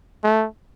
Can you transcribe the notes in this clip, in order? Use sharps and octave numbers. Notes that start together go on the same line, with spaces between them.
A3